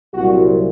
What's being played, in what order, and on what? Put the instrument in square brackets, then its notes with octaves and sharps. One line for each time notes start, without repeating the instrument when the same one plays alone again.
[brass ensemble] C2 A#2 F#3 F#4